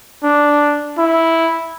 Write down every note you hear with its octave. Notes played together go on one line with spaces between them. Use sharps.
D4
E4